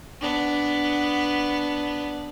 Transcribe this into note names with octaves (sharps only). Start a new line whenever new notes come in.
B3 D4